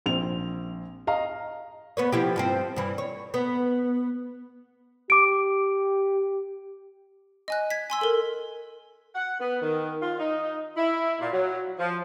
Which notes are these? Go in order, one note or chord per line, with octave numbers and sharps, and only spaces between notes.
A#1 C4 F7
D#5 F5 A#5
B3 B4 C#5
F3 E4 G4
G2 F3 C4
G2 E3
C#5
B3
G4 D6 D7
D#5 G#5 F#6
G#6 B6
G#5 C6 E6
A4 A#4
F#5
B3
D#3
F4
D#4
E4
A#2
F#3
F3